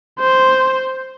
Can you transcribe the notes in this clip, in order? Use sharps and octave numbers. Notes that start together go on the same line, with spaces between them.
C5